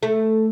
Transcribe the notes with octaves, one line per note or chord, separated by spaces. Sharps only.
A3